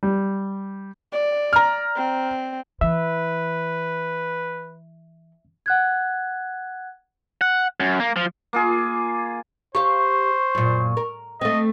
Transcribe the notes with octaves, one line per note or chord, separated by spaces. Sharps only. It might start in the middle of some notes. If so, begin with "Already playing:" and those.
G3
D5
A#5 F6
C4
E3 B4 E5
F#5 F#6 G#6
F#5
F#2
A#3
F3
A#3 F4 G#4
G4 C5 F5 C#6
F#2 A#2
A#4
A3 C4 D#5